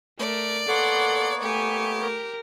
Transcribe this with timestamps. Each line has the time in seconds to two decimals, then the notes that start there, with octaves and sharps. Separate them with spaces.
0.19 A3 A#4 D5
0.68 A#3 B3 A4 C#5 F#5 C6
1.43 A3 G4 G#5 C#7
2.00 A#4